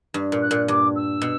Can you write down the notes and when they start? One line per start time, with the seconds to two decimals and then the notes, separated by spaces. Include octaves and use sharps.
0.14 G2
0.32 A#2
0.42 F#6
0.51 A#2
0.68 G2 D6
0.95 E6
1.22 B2